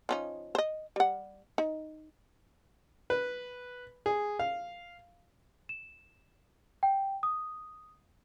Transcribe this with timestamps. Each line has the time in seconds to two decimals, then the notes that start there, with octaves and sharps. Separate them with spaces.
0.09 F3 C#4 D#4
0.55 C5 D#5
0.96 G3 F#5
1.58 D#4
3.10 B4
4.06 G#4
4.39 F5
5.69 E7
6.83 G5
7.23 D#6